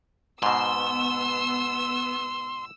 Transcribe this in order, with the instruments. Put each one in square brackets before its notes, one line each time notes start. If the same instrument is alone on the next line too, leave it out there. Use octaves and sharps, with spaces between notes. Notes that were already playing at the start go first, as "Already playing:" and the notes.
[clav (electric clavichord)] G#2 B2 [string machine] B3 [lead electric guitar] C6 [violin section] E6